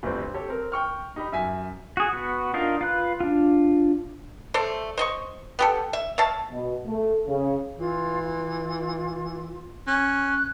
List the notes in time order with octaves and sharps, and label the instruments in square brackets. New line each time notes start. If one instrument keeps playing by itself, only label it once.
[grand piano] G1 D2 G3 C4
G4 A4 C#5
C4 A#4
G5 C#6 F6
D#4 G4 B5
F#2 E5 G#5 B6
[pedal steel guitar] F#4 G#4
B3 F#4
D4 D#4 F4 A#4
F4 B4 F#6
D4 F4
[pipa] A3 A4 C5 D5
C5 D#5 C#6
B3 G4 A4
E5
C#5 E5 F5 A5
[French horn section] B2
A3
C#3
[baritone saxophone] E3 [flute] F4
[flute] F4
[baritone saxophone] C#4 [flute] F#6